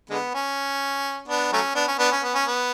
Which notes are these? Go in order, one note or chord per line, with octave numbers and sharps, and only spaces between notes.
D3 G#3 B3
C#4
B3 D4
F#3 A3 C#4
B3 D4
C#4
B3 D4
C#4
B3
C#4
B3